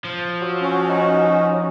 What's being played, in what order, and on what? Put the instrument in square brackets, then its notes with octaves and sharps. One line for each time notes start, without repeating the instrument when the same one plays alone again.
[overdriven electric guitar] F3
[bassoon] F#3
[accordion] C#4 F#4
[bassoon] D#4